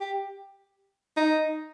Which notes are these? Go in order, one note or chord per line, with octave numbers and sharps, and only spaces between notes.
G4
D#4